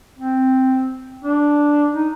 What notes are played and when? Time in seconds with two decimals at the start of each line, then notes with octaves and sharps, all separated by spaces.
0.19 C4
1.24 D4
1.94 D#4